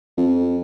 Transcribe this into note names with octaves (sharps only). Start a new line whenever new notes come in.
F2